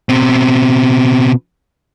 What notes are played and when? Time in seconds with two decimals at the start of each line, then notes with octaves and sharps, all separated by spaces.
0.09 B2 C4